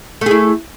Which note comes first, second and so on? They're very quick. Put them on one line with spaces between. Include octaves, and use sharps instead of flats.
A3 G#4 E4